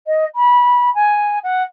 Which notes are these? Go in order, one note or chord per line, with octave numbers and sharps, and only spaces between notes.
D#5
B5
G#5
F#5